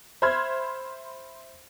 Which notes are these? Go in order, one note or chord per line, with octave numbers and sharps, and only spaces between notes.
C5 E5 B5 C6 F6 G#6